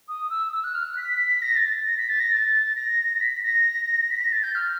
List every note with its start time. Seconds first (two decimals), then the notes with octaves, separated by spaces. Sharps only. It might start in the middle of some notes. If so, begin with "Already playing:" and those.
0.08 D#6
0.30 E6
0.52 E6
0.64 F#6
0.75 F6
0.86 F#6
0.97 B6
1.42 A#6
1.56 A6
1.86 A#6
1.97 B6
2.09 A6
2.20 A#6
2.32 A6
2.76 A#6
3.21 B6
3.43 A#6
4.11 B6
4.21 A#6
4.32 A6
4.43 G6
4.55 F6